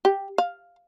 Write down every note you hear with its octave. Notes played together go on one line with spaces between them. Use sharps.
G4
F5